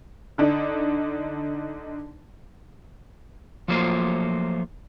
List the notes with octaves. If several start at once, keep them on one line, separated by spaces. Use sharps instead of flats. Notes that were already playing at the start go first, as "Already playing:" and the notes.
D3 D4 D#4
F3 F#3 A3 A#3 F4 C5